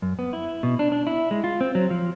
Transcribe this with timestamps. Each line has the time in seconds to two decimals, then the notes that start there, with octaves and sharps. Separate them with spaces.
0.02 F#2
0.19 B3
0.33 E4
0.63 B2
0.79 D4
0.92 D4
1.07 E4
1.31 G#3
1.44 F4
1.61 C4
1.75 F#3
1.91 F3